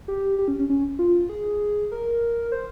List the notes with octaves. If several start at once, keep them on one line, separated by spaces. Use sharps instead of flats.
G4
G4
C#4
C#4
C#4
F4
G#4
A#4
C5